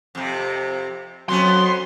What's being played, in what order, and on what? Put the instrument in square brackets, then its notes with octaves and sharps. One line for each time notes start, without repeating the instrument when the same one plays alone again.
[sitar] F2 C3
[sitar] F2 B3 C#4 [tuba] F#3 [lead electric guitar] C6